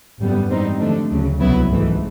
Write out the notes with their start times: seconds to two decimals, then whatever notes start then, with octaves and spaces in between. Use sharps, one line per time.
0.20 G#1 F#2 D3 G3 B3
0.50 G#2 E3 G3 C4 D#4
0.80 D3 F3 A3 D4
1.09 D2 C#3 F#3
1.40 C2 B2 F#3 B3 E4
1.70 G#1 G#2 E3 A3